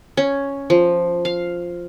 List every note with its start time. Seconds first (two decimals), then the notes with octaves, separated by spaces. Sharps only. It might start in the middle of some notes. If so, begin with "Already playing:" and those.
0.17 C#4
0.70 F3
1.25 F5